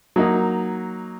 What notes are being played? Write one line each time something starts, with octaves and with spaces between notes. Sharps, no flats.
F#3 A#3 D#4